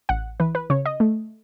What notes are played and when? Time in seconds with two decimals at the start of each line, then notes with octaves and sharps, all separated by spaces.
0.09 A1 F#5
0.40 E3 B4
0.55 B4
0.70 C#3 C#5
0.86 D#5
1.00 A3